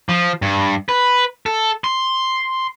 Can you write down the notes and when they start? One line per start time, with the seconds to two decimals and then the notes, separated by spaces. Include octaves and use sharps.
0.09 F3
0.42 G2
0.89 B4
1.46 A4
1.84 C6